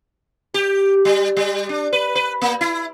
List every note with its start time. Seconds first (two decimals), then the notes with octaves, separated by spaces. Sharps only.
0.54 G4
1.05 G3
1.37 G3
1.69 D4
1.93 B4
2.15 B4
2.42 A#3
2.61 E4